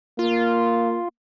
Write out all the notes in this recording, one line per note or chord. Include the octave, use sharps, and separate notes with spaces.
A#3 F4